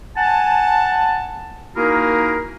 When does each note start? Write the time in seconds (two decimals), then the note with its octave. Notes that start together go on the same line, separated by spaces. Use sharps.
0.17 F#5 G#5 A5
1.76 A#3 D#4 E4 F#4 G#4 A#4